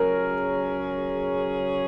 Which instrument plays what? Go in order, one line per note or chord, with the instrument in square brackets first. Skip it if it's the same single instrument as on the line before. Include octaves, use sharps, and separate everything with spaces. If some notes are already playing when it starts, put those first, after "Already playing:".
Already playing: [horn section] C#3 F#3 C#4 G#4 C#5 [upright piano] A#4